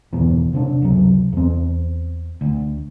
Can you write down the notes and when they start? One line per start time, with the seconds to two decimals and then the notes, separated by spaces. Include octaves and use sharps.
0.13 G1 E2 B2 E3
0.53 C3 C4 D4
0.82 F#1 C#2 C3 F#3
1.33 E2 C4
2.41 D2